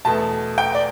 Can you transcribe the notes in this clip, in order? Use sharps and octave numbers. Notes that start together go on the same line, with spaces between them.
E2 B2 A3 A5
G5
D5